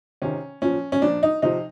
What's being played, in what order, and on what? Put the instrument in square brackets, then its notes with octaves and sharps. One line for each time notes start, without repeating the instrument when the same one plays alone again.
[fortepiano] C3 D#3 C#4
A#2 F3 C#4
C#4
A#2 F3 D4
D#4
C3 F3 D#4